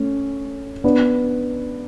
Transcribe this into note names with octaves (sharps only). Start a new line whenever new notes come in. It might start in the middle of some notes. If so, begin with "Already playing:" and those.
Already playing: A3 C#4
B3 D4